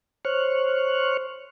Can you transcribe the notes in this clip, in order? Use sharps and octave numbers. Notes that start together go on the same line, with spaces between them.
C5 C#5 C#6 F6 F#6